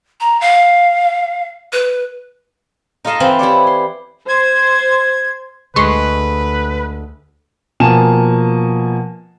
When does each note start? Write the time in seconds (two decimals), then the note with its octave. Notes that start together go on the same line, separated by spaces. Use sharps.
0.20 A#5
0.41 F5
1.72 B4
3.05 D#4 F4 A4 D#5 F5 A5
3.20 E3 C4 F4 B5
3.39 E4 G4 C#5 D5
3.67 C6
4.29 C5 G#6
5.76 D2 G#3 B4 C6 C#6
7.80 B2 F3 A#3 G#5 A5 E7